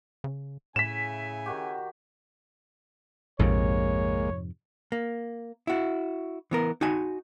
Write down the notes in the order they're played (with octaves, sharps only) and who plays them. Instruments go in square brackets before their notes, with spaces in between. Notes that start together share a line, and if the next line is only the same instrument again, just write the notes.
[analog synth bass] C#3
[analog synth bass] A2 [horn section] C#3 E4 G#5 [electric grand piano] B6 E7
[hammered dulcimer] D#3 F#4 G4
[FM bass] A#1 [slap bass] F2 G#2 C3 [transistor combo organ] G#3 A#3 [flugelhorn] C#5
[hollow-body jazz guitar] A#3
E4 F#4
E3 B3 A#4
D#4 F#4 G#5